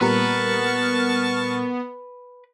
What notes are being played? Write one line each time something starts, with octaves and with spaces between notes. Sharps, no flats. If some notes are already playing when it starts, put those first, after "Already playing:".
A#2 G3 B3 A#4 B4 A5 C#6 F6